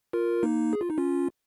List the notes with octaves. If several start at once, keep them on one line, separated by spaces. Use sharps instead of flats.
F4 A#4
A#3 D#4
G#4
F4
D#4
C#4 F4